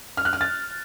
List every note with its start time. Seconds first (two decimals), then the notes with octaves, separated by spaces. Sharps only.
0.17 F6
0.25 F#6
0.33 F6
0.41 A6